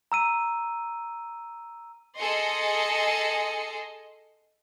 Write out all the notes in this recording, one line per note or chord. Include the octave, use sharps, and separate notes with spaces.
A#5 E6 D#7
G#4 A4 D#5 C6 C#7